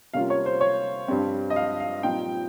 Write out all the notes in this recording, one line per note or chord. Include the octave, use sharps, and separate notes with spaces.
C3 G3 A#3 C#4 F4 F5
C#5
C5
C#5
G2 G3 C4
D#5
F5
F5
A#2 G3 C4 D#4 G5